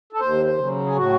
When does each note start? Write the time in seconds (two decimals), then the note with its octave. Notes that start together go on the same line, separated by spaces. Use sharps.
0.13 A4
0.20 D#2 C5
0.46 C5
0.58 C#3 F#3
0.86 G#4
0.96 A2 F#4